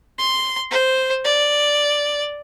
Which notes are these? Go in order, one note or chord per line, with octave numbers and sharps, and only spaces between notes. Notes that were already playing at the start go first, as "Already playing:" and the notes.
C6
C5
D5